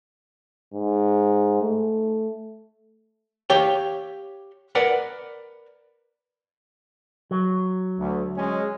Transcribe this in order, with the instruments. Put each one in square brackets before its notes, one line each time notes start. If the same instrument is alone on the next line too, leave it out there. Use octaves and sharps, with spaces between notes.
[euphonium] G#2
A3
[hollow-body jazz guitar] G4 C#5 F5 G5
A#4 B4 D5 F#5
[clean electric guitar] F#3
[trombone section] D2
G#3 C#4